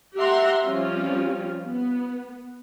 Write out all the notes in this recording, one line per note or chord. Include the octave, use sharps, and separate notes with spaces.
G4 E5 F#5 A#5 C6
F3 G3 C4 C#4 F4
B3